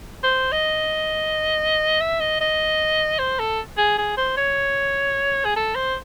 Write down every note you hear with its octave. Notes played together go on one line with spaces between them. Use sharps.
C5
D#5
E5
D#5
D#5
C5
A4
G#4
G#4
C5
C#5
G#4
A4
C5